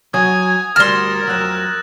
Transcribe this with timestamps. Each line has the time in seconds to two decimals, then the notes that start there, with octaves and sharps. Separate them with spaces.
0.14 F#3 G#5 D#6 G#6
0.76 D2 G3 A#4 C6 F6 A6 A#6 E7
1.27 F2 F#3 E6 F#6 E7